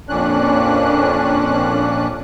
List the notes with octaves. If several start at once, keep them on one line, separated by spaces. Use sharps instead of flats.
F2 A#2 C#4 D4 F#6